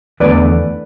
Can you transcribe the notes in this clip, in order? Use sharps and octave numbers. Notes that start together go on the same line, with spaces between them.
E2 D3 A3 B4 D5